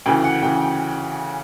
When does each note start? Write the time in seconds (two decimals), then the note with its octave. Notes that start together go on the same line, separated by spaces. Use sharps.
0.06 D2 C#3 E3 G5
0.24 F#5
0.42 D2 C#3 E3 G5
0.61 G5